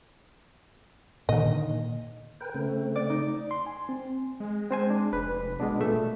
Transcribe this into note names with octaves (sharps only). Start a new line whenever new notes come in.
A#2 D3 D#3 D#5
A#4 B4 G5
C#3 A3 C4
D5
D#4
C6
G#5
C4
G#3
C4 C5 G#5
D4
F1 B4
B2 G#3 B3 D4
A#2 A3 E5